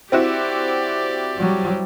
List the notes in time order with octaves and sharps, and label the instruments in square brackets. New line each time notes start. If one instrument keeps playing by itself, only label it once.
[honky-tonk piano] C4 E4 F#4 [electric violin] G4 D5
[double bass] F#3 G3